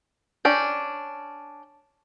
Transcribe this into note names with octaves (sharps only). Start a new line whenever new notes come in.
C#4 D4 G5